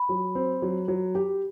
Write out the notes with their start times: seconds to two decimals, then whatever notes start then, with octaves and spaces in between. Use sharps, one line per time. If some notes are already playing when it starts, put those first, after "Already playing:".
Already playing: B5
0.09 F#3
0.35 C4
0.62 F#3
0.88 F#3
1.15 G4